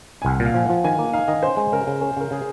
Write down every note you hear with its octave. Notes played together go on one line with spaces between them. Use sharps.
G#5
C2 F#5
A#2
F5
F3 G#5
F3 F#5
D#3 G#5
A#3
D#4 F5
D#3 D#5
C#4 C5
G#3
C#3 A#4
C#3
C#4 A#4
C#3 A#4
C#3 G#4